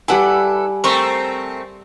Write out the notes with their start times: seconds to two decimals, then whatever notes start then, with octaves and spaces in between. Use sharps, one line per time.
0.08 G3 E4 A4 B4 F#5 G#5 D6
0.84 A3 C4 A#4 C6 C#6